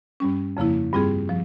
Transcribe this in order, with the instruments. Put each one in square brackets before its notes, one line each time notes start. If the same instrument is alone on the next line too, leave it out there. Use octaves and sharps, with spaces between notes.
[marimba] G2 G3 C#4
F2 C#3 F3 A#3 E4
G2 G3 C4 F4 G#4
F3